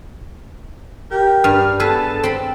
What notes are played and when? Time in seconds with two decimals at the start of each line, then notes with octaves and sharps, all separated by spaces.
1.11 G4 A#4
1.44 G2 F6
1.80 B3 G#4 A4 B4 A5
2.23 C4 B5